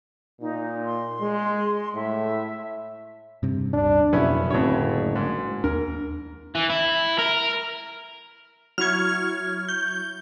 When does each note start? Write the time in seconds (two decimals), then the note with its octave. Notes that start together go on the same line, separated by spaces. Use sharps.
0.41 A#2 D#4
0.86 C6
1.21 G#3
1.95 A2 E5
3.43 G2 C3
3.73 D1 G2 D4
4.13 F#1 F2 B2 F#3 B3 C#4 E4
4.50 F#1 F2 A2 D3 C#5
5.16 G#2
5.64 D#2 D4 A#4
6.55 E3
6.70 E4
7.19 A#4
8.78 F#3 E4 C#6 F6 G#6
9.69 G6